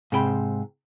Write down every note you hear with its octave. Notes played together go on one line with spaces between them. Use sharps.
G#2 C3 G5 B5